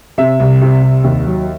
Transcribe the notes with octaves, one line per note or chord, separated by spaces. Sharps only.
C3 E5
C2
C3
C2
D#2
F#3